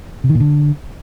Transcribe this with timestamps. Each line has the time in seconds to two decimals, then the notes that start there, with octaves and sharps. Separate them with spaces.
0.24 C3
0.29 D#3
0.35 A#2
0.40 D3